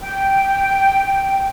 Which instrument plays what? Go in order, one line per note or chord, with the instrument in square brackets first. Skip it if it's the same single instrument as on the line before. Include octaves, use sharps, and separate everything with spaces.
[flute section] G5